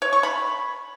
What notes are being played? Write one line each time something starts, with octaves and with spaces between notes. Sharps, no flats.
C#5
C#6
B5